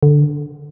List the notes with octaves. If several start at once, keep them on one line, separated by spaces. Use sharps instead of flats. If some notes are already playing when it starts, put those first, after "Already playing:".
D3